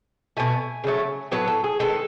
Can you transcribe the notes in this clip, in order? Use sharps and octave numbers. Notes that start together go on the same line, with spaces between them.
B2 A3 G#5
C#3 F#3 A3
A2 F#3 B3 B4
A4
G#4
D#3 G#3 B3 A4